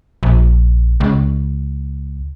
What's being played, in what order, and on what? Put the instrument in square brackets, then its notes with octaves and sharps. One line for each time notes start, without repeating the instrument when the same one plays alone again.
[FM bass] A#1
C#2